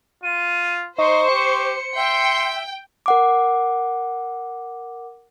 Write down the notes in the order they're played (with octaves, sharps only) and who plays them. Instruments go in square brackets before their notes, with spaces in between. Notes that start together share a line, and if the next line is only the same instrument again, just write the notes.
[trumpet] F4 [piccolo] D#7
[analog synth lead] D#4 [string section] C5 [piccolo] C#6
[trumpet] G4 [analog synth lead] C#7
[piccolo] E5 [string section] G5 [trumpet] C6
[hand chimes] A#4 F#5 D6